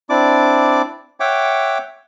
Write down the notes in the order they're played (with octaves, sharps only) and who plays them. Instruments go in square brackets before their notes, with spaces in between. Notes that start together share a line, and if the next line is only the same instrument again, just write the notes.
[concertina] C4 D4 E4 D5 D6
C#5 E5 F#5 G5 D6